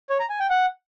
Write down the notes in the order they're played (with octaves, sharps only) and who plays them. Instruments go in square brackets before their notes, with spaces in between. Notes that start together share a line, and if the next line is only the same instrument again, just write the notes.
[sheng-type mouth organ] C#5
A#5
G#5
G5
F#5